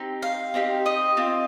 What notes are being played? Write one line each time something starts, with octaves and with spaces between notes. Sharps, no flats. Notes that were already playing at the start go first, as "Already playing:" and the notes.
Already playing: C4 D#4 G4
F5
C4 D#4 G4
D#5
C4 F4